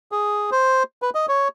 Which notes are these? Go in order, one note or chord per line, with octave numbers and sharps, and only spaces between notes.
G#4
C5
B4
D#5
C#5